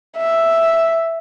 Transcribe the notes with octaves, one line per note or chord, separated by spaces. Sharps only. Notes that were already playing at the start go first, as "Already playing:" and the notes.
E5